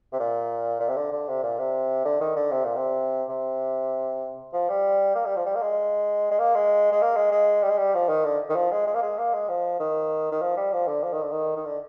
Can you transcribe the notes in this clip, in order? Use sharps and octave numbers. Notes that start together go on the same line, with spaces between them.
C3
A#2
A#2
C3
D3
D3
C3
A#2
C3
D3
D#3
D3
C3
A#2
C3
C3
F3
G3
A#3
G3
F3
G3
A#3
G#3
G#3
A#3
G#3
G#3
A#3
G#3
G#3
G3
G#3
G3
F3
D#3
D3
D#3
F3
G#3
G#3
A#3
G#3
A#3
G#3
F3
D#3
D#3
F3
G3
F3
D3
F3
D#3
D3
D#3
D#3
D3